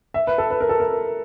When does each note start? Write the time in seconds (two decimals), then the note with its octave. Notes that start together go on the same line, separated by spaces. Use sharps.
0.14 E5
0.27 B4
0.38 A4
0.50 B4
0.61 A#4
0.69 A4
0.80 A#4